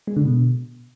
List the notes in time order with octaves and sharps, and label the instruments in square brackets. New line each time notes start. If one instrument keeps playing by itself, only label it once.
[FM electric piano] G#3
D3
B2